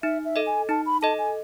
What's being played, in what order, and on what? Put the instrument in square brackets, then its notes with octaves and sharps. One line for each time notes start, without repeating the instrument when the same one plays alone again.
[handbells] D#4 [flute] E5
[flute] E5
[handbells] A4 D#5
[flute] G#5
[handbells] D#4 [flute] A5
[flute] B5
[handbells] A4 D#5 [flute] A5
[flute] G#5